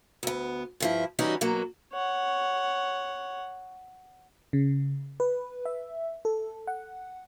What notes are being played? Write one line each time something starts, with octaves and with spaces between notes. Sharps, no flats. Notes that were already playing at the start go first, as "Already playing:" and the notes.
D2 B3
G2 F3 E4
E3 G3 C#4 D#4 F#4
B2 F#3 A#3
C#5 F#5
C#3
B4
E5
A4
F#5